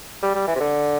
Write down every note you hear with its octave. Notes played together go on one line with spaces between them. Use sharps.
G3
G3
E3
C3
D3